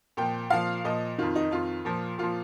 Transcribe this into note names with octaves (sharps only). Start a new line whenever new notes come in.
A#2 F3 G5
A#2 F3 F5
A#2 F3 D#5
F2 D#3 F4
D#4
F2 D#3 F4
A#2 F3
A#2 F3 F4